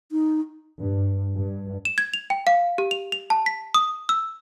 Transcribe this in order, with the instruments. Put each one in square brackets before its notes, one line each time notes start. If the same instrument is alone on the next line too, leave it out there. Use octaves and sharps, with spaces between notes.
[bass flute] D#4
[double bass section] G2
G2
[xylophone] E7
G#6
F7
G5
F5
G4
F7
F7
A5
B6
D#6
E6